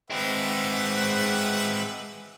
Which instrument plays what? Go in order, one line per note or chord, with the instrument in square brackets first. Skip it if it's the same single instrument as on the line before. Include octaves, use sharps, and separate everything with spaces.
[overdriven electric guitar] G#3 C4 [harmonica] B4 E5 F#5